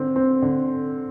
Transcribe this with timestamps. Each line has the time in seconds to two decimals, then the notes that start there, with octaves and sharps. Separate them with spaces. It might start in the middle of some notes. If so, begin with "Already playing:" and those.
Already playing: D3 C4
0.16 C4
0.42 D3